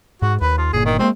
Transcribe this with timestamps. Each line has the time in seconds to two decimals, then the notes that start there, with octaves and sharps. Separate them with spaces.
0.22 G#2 F#4
0.41 D#2 B4
0.58 F4
0.73 G1 A#2 G#4
0.86 D#3
0.99 G#3 A#3 C4